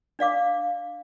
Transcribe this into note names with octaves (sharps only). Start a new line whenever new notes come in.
D4 D5 F5 D6